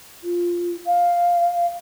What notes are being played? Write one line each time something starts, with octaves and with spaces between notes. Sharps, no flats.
F4
F5